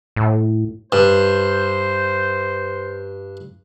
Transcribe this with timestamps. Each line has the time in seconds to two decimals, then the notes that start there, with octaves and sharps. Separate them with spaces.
0.16 A2
0.92 G2 C5